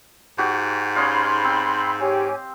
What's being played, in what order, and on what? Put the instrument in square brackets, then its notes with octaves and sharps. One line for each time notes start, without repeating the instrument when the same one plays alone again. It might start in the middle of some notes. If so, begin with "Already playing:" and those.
[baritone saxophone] G#2 [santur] F#4 G4
[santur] C#4 D#5 F5 [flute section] B5 C6
[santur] C4
[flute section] G4 C#5 G#5